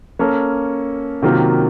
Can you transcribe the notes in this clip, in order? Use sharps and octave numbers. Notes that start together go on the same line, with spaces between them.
A#3 C#4 A4
C3 D#3 F#3 A#3 F4